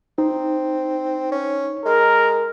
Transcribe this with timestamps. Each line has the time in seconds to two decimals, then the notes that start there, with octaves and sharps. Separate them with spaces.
0.18 C4 D#4
1.32 C#4
1.86 G#3 A#4